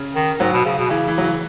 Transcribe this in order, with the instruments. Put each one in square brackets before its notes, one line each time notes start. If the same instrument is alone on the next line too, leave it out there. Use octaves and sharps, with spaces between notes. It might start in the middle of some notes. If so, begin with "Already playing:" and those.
Already playing: [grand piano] C#3
[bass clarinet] D#3
[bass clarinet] G#2 [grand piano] F#3
[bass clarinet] B2
C#3
B2
[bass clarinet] C#3 [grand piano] E3
[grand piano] E3
[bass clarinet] C#3 [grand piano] F#3
[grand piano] E3